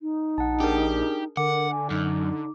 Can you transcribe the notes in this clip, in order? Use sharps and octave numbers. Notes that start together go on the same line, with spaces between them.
D#4
A#1 F#5 A5
D4 G4 G#4 A#4
D3 A#4 F#5 D6
G#5
F#2 D#4